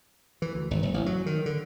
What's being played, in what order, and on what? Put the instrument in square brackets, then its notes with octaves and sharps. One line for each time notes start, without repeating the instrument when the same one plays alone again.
[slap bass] E3
D2
G#1
F#1
A1
F#3
D#3
D3